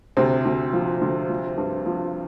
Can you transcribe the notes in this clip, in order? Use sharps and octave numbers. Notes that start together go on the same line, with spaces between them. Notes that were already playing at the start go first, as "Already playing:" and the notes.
D2 C3 C4
D2
F3
D2
F3
G2
F3